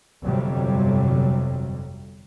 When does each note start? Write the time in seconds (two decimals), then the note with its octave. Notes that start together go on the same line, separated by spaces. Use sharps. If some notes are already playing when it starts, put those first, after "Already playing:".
0.24 G1 F2 C3 F#3 G3